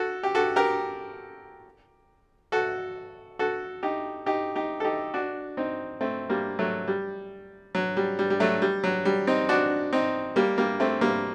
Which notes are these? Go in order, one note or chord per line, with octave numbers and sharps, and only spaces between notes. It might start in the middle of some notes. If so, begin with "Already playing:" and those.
Already playing: F#4 A4
G4
F#4 A4
G4 A#4
F#4 A4
F#4 A4
D#4 G4
D#4 G4
D#4 G4
A4
D#4 G4
D4 F#4
C4 D#4
A3 C4
G3 A#3
F#3 A3
G3
F#3
G3
G3
G3
F#3 A3
G3
F#3
G3
C4 D#4
D4 F#4
C4 D#4
G3 A#3
G3 A#3
A3 C4
G3 A#3